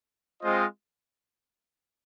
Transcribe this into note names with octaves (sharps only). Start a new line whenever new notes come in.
G#3 C4 F4 C5 D#5